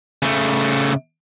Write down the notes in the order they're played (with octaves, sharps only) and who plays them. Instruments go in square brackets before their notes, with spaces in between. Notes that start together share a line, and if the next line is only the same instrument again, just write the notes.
[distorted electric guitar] C#3 A3